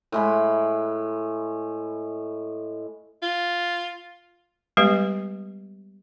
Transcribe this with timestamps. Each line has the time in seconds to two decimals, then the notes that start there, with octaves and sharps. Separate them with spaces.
0.12 A2 G#3 B5
3.22 F4
4.77 G3 G#3 B3 G4 B4